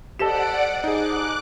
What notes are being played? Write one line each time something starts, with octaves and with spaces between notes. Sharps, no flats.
G4 A4 C5 D5 D#5 F#5 D6 E7
D#4 G#4 D6 F#6